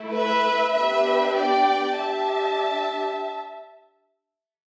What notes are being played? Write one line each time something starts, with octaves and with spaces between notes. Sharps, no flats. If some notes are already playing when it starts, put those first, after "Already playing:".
Already playing: A3 E4
B4 E5
B3 D4 G4 B4 E5
D5 G5
D4 G4 E5 A5